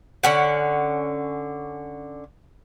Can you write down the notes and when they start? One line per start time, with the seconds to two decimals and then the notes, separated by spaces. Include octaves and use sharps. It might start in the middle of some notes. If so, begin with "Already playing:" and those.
0.23 D3 C#4 F#5